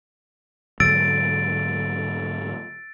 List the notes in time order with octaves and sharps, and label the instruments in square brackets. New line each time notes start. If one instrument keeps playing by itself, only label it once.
[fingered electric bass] G#2 D3 F#3 [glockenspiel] E6 A6 D7